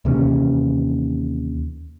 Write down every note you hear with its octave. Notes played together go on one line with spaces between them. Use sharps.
D#2 C3 E3 C#4